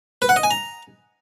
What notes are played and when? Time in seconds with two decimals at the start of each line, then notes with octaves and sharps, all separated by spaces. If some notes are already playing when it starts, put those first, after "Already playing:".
0.22 B4
0.29 F#5
0.36 D#5
0.43 G#5
0.51 A#5